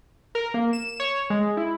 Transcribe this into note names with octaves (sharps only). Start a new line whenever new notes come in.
A#4
A#3
E7
C#5
G#3
E4